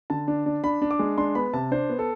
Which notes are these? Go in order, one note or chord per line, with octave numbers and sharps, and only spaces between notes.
D3 A5
D4
D4
D4 B5
D4
D6
G#3
D4 C6
B3 B5
C3 A5
D4 C5
B3
A4